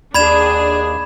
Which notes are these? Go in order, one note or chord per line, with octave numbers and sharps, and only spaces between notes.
D#2 D4 G#4 D5 B5 G#6 E7